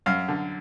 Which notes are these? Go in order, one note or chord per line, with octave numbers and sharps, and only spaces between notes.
F#2 F5
D3